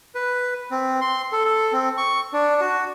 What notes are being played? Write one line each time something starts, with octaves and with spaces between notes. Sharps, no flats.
B4
C4
C6
A4
A4
C4
C#6
D4
F#4